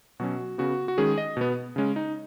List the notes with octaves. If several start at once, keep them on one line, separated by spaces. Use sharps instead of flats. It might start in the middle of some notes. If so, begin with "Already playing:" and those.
B2 F#3 C#4 F#4
C#3 B3 F#4
F#4
D#3 G#3 C#4 G#4
D#5
B2 B3
C#3 G#3 C#4
D#4